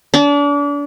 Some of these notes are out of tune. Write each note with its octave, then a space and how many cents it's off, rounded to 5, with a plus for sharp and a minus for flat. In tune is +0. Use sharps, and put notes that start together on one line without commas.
D4 -35